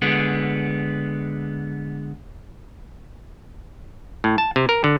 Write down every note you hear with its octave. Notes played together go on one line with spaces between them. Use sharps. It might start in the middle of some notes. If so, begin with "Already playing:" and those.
D3 G#3 B3
A2
A5
C3
A#4
D3